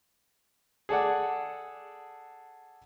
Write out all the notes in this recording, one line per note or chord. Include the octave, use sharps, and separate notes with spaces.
G#4 A4 D5 F#5